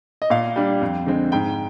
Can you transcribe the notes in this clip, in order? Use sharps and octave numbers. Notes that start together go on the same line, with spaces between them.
D#5
A#2 F5
G3 D4
F2
D3 G#3 C4
G#2 G5